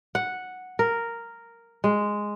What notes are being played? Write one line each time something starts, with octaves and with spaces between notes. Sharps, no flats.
F#5
A#4
G#3